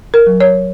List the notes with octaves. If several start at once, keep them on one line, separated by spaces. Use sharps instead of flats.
A#4
F#3
C#5